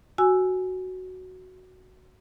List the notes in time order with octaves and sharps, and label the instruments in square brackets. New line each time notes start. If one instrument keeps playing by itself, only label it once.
[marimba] F#4 G#5 E6